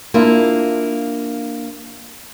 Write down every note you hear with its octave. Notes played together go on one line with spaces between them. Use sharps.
A#3 D4 E4 F4